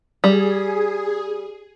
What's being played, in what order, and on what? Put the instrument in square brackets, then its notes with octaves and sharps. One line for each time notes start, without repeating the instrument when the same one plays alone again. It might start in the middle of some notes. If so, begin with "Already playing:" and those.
[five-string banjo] G3 [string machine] G#4